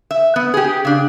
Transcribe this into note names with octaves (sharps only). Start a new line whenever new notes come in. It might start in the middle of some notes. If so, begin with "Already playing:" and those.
E5
B3
G4 G#4
C#3 D4